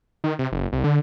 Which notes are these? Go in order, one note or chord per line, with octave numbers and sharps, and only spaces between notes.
D#3
C3
F#1
C2
D3